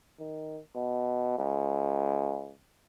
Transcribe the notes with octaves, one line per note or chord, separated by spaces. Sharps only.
D#3
B2
C#2